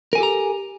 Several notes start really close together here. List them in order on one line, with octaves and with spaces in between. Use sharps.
A#4 G#5 A4 G4 A#5